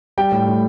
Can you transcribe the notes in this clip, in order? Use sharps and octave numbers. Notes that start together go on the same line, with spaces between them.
G3 G5
A2
A2